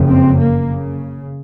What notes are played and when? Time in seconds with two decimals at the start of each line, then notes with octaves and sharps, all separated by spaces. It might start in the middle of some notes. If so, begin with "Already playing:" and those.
Already playing: F#1 F2 C#3
0.08 C4
0.37 A#3
0.68 C#3